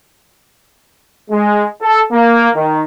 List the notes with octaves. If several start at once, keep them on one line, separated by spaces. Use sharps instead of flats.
G#3
A4
A#3
D#3